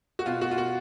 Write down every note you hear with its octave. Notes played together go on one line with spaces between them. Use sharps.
F#4
B2 F4
F#4
F4
F#4